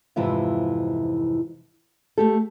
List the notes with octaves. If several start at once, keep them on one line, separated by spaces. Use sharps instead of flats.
F2 G#2 C3 E3 E4 F4
A3 G4 A4